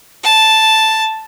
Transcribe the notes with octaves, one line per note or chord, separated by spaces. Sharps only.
A5